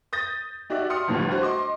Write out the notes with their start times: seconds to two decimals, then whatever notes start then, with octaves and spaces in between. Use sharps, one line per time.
0.13 D#6 G6 A6 A#6
0.70 D#4 F#4 G4 D5 E5
0.90 C6 D#6 F6 C#7
1.08 G1 D2 A2 F3 G3
1.31 F#4 C5
1.43 D#5 C6 D6